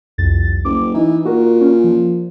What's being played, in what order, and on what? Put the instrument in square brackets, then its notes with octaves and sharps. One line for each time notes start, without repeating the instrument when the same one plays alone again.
[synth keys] C2 F2 A6
[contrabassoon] F#1 [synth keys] D6
[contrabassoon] E3 [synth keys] D#4
[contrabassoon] A#2 [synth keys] F#4 A#4
[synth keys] C#4
F3